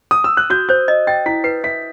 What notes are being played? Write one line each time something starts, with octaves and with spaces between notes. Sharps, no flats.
D#6
E6
F#6
F#4 G6
C5 G6
D#5
G5 A6
E4 B6
B4 C7
E5 B6